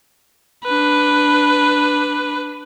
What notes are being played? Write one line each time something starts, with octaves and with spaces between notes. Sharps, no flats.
D4 B4